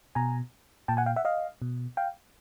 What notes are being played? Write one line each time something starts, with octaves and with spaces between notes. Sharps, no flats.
B2 G#5 A#5
A#2 G5 A5
F#5 G#5
F5 G5
E5 F#5
D#5 F5
B2
F5 G5